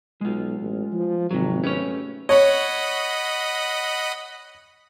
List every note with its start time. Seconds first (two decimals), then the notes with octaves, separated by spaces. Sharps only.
0.21 B1 G#3 F4
0.60 A1
0.93 F3
1.31 G#1 C3 F#3
1.64 A3 C#4 G4 B4 C#5
2.29 C#5 D#5 F#5 B5